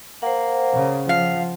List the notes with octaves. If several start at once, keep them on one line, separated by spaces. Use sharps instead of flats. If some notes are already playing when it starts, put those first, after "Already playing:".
A#3 C5 F#5
C#3
F3 F5